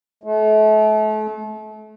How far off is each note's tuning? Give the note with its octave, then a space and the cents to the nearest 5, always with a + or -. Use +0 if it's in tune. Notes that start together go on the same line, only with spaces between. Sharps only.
A3 -35